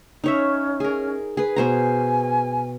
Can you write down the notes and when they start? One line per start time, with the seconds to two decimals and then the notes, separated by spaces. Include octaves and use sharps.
0.24 C#4 D#4 C#5 E5
0.80 G#4 A#4
1.37 G#4 B4
1.56 B2 C5 G#5 A#5